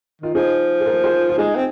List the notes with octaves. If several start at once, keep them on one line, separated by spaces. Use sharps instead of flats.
D#3 F4
F3 D#4 G#4
G#4
F4 A#4
G#4 C5
F4
G#3 D#4 G#4
C4